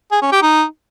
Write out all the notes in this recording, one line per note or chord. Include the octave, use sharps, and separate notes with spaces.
G#4
C#4
G4
D#4